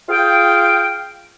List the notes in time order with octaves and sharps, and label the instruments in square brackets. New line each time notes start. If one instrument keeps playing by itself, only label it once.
[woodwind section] F4 G#4 F5 G5